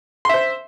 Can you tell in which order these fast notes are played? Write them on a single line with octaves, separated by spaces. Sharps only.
C6 E5 C5